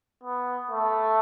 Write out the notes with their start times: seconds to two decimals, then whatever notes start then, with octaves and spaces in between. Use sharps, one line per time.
0.23 B3
0.71 A3